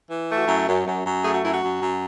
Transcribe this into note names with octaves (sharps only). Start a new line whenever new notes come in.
E3
A3
F#4
F#2 E4
F#2
F#2
F#2
A3 G#4
F#4
F#2 E4
F#4
F#2
F#2